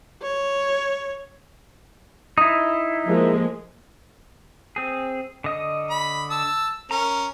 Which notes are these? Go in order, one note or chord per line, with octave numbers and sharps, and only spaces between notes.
C#5
D#4 E4 D#6
F3 G#3 A#3
C4 G#4
D3 D#5 D#6
B5
A5 E6
C#4 A#4 A#5